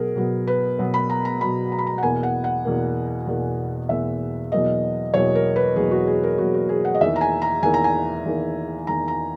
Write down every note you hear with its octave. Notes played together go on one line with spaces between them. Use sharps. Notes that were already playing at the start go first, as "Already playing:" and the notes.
Already playing: B2 F#3 B3 G#4 A#4
B2 F#3 B3
B4
B2 F#3 B3
B5
A#5
A#5
B2 F#3 B3 B5
A#5
B5
A#5
F#5
E2 B2 A#3 G#5
F#5
F#5
E2 B2 A#3
E2 B2 A#3
E2 B2 A#3 E5
E2 B2 F#3 A#3 D#5
E2 B2 F#3 A#3 C#5
A#4
B4
E2 B2 F#3 A#3 G#4
F#4
G#4
A#4
E2 B2 F#3 A#3 F#4
F#4
G#4
F#5
D#5
E2 D#3 A#3 E5
A#5
G#5
A#5
E2 D#3 A#3 G#5
A#5
G#5
E2 D#3 A#3
E2 D#3 A#3 A#5
A#5